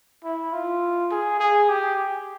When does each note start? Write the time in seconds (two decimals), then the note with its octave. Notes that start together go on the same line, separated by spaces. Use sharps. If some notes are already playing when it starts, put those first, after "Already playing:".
0.24 E4
0.53 F4
1.11 G#4
1.40 G#4
1.69 G4